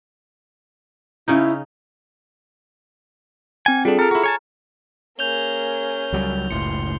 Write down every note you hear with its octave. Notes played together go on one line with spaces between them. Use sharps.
C#3 C#4 D#4 E4
C4 G5 G#5
G3 D4 F4 G#4 A4
A4 A#4 A#5 F6
E4 F#4
C#5 G#5 A5
A#3 C#4 G#4 G6 F7 G7
C#2 F#3 G3
F#1 C#2 A2 C6 C#7